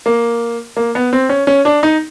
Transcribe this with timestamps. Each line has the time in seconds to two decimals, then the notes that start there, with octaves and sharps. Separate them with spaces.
0.06 A#3
0.77 A#3
0.95 B3
1.13 C4
1.29 C#4
1.47 C#4
1.65 D4
1.83 D#4